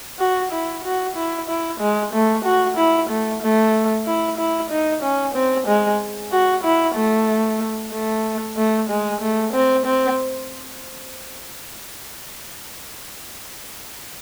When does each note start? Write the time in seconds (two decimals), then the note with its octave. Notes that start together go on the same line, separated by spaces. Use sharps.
0.20 F#4
0.52 E4
0.84 F#4
1.16 E4
1.48 E4
1.80 G#3
2.13 A3
2.45 F#4
2.77 E4
3.10 A3
3.42 A3
4.06 E4
4.38 E4
4.70 D#4
5.03 C#4
5.34 C4
5.67 G#3
6.32 F#4
6.64 E4
6.96 A3
7.93 A3
8.57 A3
8.90 G#3
9.21 A3
9.53 C4
9.86 C4